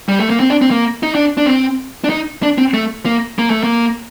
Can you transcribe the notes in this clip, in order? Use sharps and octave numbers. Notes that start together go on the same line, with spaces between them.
G3
A3
A#3
C4
D4
C4
A#3
D#4
D4
D4
C4
D4
D#4
D4
C4
A3
A#3
A#3
A3
A#3